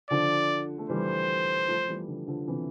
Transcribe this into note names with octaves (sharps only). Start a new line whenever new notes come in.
D3 F3 D5
A3
E3 G3 C5
F3 A3
E3 G3
D3 F3
D3 F3
C3 E3